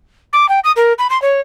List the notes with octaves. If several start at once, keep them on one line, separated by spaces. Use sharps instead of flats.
D6
G5
D#6
A#4
B5
C6
C#5